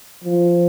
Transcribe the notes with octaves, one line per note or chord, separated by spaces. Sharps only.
F3